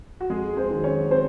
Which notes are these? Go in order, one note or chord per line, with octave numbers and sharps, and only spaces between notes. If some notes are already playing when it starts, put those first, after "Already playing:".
F#4
F2 G#3 G#4
C4 C5
D#3 F#3
C#4 C#5
C4 C5